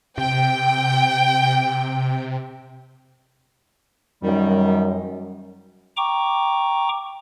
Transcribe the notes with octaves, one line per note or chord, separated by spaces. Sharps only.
C3 G5
F#2 D#3 G3
G5 A#5 C#6 D6